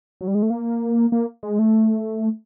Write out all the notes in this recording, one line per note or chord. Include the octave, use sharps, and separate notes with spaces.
F#3
G3
G#3
A3
A#3
A#3
G#3
A3